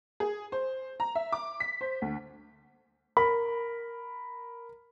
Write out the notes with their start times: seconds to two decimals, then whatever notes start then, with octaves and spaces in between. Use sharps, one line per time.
0.20 G#4
0.52 C5
1.00 A#5
1.15 E5
1.32 D6
1.60 B6
1.81 C5
2.02 D2
3.17 A#4 B5